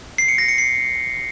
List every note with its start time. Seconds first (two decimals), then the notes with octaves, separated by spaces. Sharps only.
0.18 C7
0.28 C#7
0.38 A#6
0.48 C#7
0.58 C7